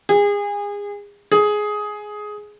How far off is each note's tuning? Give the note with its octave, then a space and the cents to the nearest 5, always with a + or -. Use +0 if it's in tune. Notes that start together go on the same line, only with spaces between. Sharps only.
G#4 -30
G#4 +10